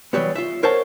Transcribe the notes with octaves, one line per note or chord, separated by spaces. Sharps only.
E3 F#3 G3 B3
F4 E5
A#4 C5 C#5 E5 F#5 A5